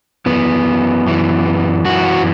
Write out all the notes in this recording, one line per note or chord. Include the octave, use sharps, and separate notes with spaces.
F#2 E3 B3
F#2 E3
F#2 E3 F#4